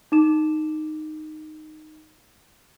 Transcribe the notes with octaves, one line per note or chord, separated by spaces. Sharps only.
D#4 D6 E7